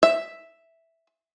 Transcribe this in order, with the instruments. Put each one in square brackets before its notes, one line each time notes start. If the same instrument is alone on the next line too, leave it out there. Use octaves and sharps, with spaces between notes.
[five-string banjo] E5